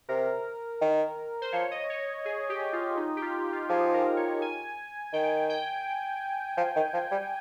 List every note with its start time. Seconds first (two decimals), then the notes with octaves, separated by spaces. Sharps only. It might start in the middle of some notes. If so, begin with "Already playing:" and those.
0.09 C3 A#4
0.81 D#3
1.42 C5
1.53 F3 C#5
1.71 D#5
1.90 C#5
2.25 G#4
2.49 G4
2.73 F4
2.97 D#4
3.17 G4
3.22 F4
3.45 G4
3.53 F4
3.60 G4
3.69 F3 G#4
3.94 A#4
4.17 C#5
4.42 G#5
5.13 D#3 G5
5.50 G5
6.57 F3
6.76 D#3
6.93 F3
7.11 G3